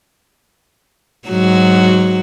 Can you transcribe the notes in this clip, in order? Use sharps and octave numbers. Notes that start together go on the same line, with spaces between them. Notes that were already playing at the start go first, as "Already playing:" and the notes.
G#2 F#3 F#4